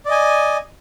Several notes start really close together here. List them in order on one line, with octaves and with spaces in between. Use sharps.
D5 D#5 G#5